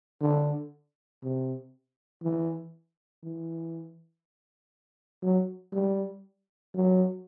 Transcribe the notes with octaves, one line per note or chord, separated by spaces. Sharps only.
D3
C3
E3
E3
F#3
G3
F#3